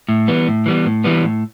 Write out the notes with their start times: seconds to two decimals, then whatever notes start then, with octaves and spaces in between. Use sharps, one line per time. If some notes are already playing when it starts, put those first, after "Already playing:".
0.09 A2
0.28 E3 G3 B3
0.48 A2
0.66 E3 G3 B3
0.86 A2
1.04 E3 G3 B3
1.24 A2